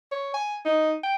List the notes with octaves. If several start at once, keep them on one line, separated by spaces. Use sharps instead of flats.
C#5
G#5
D#4
G5